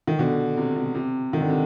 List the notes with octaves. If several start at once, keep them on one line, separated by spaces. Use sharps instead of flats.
D#3
B2 D3
C3
B2
C3
D#3
D3
C3